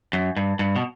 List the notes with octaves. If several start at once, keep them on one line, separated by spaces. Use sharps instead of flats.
F#2
G2
G2
B2